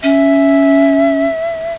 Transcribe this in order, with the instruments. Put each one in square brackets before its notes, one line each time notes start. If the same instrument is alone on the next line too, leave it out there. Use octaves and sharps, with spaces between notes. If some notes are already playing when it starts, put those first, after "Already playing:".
[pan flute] C#4 [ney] E5